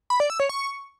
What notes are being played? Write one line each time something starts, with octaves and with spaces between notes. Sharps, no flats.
B5
D5
E6
C#5
C#6